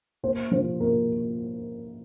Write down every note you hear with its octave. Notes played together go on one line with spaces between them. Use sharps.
A#2 C5
F3 C5
A#2 A#4